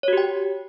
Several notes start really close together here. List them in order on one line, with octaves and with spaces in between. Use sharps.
C#5 F#4 G4 G5